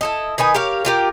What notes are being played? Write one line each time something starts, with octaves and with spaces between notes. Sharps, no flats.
E4 A4 D#5
D#3 D#4 B4 G#5
G4 A#4 C#5 F5
F4 G4 A#4